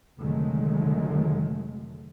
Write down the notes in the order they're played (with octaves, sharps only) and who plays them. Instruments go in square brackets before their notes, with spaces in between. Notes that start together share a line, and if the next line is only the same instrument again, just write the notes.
[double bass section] F1 D3 D#3 F#3 G#3 A3